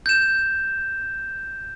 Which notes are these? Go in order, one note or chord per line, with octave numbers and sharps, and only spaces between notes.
G6 E7